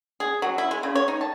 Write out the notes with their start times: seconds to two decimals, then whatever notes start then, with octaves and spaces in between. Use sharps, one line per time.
0.20 G#4
0.42 F#3
0.58 E4
0.71 G#3
0.83 C#3
0.95 C#5
1.08 D#4
1.21 A5